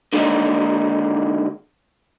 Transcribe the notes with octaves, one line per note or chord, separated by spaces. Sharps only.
D3 D#3 G#3 A#3 D4 D#4